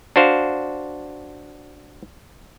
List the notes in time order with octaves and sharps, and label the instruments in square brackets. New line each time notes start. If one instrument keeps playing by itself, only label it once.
[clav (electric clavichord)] D4 F#4 C5 F5